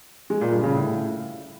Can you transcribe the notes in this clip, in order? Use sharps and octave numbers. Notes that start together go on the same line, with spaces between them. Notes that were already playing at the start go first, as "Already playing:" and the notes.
G#3
A#2
G2
C#3
A2